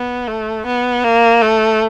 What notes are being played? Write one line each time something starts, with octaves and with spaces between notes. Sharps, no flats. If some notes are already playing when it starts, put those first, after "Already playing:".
Already playing: B3
A3
B3
A#3
A3